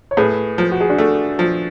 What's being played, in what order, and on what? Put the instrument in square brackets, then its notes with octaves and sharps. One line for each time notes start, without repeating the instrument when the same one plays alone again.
[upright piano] C#5
[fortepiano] A2 [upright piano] G#4 B4
[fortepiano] F3
[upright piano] F#4
G#4
D4 F#4
[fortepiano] A3
F3